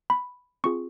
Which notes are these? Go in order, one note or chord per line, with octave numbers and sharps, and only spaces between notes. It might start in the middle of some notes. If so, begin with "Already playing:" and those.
B5
C4 F4 G#4 C#6